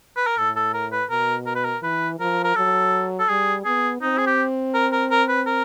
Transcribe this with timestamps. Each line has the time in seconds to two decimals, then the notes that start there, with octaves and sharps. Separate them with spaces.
0.17 B4
0.27 A#4
0.37 A2 A4
0.56 A4
0.74 A#4
0.92 B4
1.10 B2 A#4
1.47 A#4
1.55 B4
1.65 A#4
1.83 E3 B4
2.20 F3 A#4
2.44 A#4
2.56 F#3 A4
3.20 A4
3.29 G3 G#4
3.65 B3 G#4
4.01 C4 D#4
4.18 G#4
4.27 G4
4.74 A#4
4.92 A#4
5.10 A#4
5.29 B4
5.47 A#4